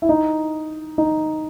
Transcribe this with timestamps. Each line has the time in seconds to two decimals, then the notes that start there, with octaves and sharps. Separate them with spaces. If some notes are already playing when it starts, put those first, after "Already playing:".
0.02 E4
0.09 D#4
0.98 D#4